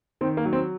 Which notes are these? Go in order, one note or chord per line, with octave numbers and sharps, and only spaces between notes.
D#3 C4
A#3
F#3
C4